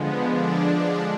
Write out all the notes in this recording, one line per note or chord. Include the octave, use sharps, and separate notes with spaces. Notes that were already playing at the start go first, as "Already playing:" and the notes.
Already playing: D3 F3 G#3 B3
D4